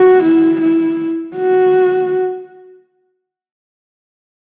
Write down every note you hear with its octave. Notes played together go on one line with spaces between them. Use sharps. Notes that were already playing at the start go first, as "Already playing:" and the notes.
Already playing: F#4
E4
E4
F#4